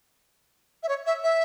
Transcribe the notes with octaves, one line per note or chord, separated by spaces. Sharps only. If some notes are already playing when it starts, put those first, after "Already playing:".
E5
C#5
E5
E5